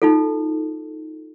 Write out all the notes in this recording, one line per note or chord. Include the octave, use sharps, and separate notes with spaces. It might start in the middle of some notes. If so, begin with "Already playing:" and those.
D#4 F4 A4